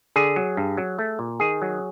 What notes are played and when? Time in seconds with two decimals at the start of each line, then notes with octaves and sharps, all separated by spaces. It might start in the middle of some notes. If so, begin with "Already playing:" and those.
0.16 D3 G#4
0.36 F#3
0.57 G2
0.77 F#3
0.99 A3
1.19 A#2
1.40 D#3 G#4
1.62 F#3